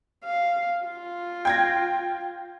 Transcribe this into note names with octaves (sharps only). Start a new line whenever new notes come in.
F5
F4
G5 G#6 A#6